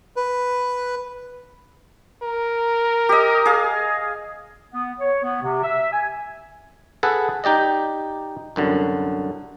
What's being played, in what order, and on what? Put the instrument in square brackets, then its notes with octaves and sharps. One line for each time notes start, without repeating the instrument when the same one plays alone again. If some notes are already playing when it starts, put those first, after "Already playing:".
[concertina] B4
[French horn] A#4
[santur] G4 D#5
G#4 F5
[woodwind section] B3
C#5
B3
C3
E5
G#5
[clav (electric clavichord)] G#4 A4 B4 F#5
D#4 G4 D5 D#5
C2 F#2 D3